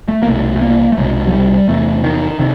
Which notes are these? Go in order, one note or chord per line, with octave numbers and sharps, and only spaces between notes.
A3
A#3
C2 B2 A3
A3
A#3
A3
C2 B2 G#3
F#3
G3
E2 C3 A3
D#3
C3 D#3